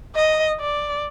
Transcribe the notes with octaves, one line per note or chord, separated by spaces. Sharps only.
D#5
D5